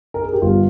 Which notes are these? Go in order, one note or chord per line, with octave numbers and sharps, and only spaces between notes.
A#4
G#4
G4
G1 F4